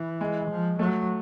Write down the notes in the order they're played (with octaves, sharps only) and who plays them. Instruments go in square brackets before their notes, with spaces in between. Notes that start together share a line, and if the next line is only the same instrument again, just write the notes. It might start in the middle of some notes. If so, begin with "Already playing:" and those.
Already playing: [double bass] E3
[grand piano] G#3
[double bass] F3
[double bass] F#3 [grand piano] A3